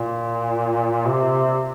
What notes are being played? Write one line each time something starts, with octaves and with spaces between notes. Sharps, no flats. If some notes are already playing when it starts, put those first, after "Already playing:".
Already playing: A#2
C3